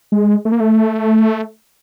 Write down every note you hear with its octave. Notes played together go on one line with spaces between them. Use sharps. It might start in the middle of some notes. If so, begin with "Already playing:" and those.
G#3
A3
A#3
A3